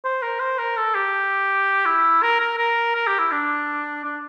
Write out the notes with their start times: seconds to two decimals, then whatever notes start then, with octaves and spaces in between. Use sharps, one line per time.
0.05 C5
0.23 A#4
0.40 C5
0.59 A#4
0.77 A4
0.95 G4
1.86 E4
2.23 A#4
2.40 A#4
2.58 A#4
2.95 A#4
3.07 G4
3.19 E4
3.32 D4
4.05 D4